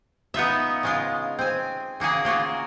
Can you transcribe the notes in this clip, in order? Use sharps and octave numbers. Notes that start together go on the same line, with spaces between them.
B3 D#4 F4 E5
C#3 G#3 F4
C4 G#5
C#3 A#3 F#4 G#4
A#3 F4 F#4 G#4